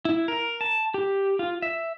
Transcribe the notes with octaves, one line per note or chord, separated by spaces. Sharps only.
E4
A#4
A5
G4
F4
E5